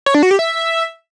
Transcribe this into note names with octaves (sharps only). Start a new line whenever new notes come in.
C#5
D4
F#4
G4
E5